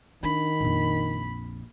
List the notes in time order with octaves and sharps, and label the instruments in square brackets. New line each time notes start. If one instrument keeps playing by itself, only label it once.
[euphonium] D#3 [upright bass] D4 [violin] B5
[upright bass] A#1 F2